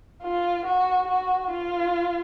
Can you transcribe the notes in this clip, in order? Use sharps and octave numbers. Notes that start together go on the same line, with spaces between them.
F4
F#4
F#4
F4